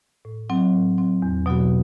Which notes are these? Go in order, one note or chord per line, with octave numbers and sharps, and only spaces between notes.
A2
F#3 C4
A2
F#3 C4
E2
B2 F#3 B3 F#4